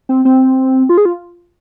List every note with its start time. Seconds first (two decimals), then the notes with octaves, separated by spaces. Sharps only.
0.09 C4
0.25 C4
0.89 F4
0.98 G#4
1.05 F4